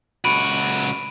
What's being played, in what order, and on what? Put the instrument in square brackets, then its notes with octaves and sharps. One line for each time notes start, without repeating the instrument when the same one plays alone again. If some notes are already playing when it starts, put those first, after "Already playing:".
[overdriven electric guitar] C#2 F#4 [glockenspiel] B5 D7 D#7